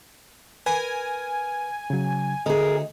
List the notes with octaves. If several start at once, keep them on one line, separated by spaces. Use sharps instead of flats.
A#4 B4 G#5
C#3 F#3
D2 G#4 A#4 D#5